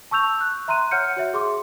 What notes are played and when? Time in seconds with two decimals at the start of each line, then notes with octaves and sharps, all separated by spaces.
0.11 A5 C#6 E6 G6 F7
0.41 F#6
0.68 E5 A#5 C6 F#6 D#7
0.91 C#5 F#5 F6 G6 C#7
1.17 F#4 C#5 E5
1.34 G#4 C6 D6